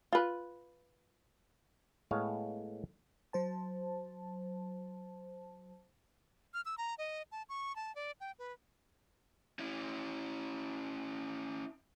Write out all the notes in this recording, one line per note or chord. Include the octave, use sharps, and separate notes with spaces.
F4 B4
A2 G#3 B3 C#5 F5
F#3 C5 A5
F6
E6
A#5
D#5
A5
C#6
A5
D5
G5
B4
C#4 E4